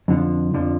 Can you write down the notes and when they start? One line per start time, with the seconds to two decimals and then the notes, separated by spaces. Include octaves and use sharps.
0.08 F2 D3 F3
0.54 F2 D3 F3